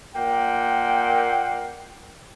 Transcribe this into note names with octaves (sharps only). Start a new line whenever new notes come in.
A#2 A#3 F#5 G5